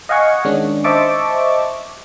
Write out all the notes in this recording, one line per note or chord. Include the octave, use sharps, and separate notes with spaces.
D#5 F5 F#5 G#5 C#6
D#3 G#3 C#4 D4
C5 D#5 E5 A5 C#6 D6